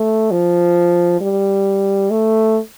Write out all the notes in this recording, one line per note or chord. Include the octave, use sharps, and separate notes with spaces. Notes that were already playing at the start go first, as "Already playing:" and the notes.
Already playing: A3
F3
G3
A3